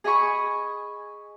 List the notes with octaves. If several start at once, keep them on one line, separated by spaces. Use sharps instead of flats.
G#4 D#5 G#5 B5 C#6